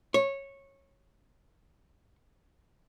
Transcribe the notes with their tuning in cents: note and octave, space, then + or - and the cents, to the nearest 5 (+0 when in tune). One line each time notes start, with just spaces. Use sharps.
C#5 -15